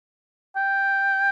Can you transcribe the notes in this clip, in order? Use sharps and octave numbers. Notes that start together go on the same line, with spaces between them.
G5